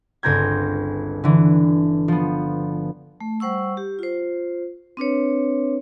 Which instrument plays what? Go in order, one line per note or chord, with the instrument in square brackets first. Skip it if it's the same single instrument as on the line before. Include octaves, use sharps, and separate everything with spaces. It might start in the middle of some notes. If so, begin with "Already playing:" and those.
[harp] G1 C#2 C4 A#5 G6 G#6
D3 E3
F3 B3
[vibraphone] A3
G3 C5 F#5 C#6 E6
G4
F4 C5
C4 D4 B4 C#5